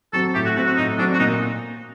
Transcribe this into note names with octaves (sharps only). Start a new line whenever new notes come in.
F#3 C4 A4
A2 G4
F#4
F#3 C4 F#4
F#4
A2 D#4
F#3 C4 D4
F#4
A#2 D#4